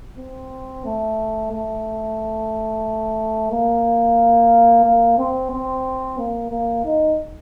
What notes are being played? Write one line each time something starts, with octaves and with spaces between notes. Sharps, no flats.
C4
A3
A3
A#3
A#3
C4
C4
A#3
A#3
D#4